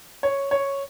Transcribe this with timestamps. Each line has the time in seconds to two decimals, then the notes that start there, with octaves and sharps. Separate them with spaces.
0.23 C#5
0.51 C#5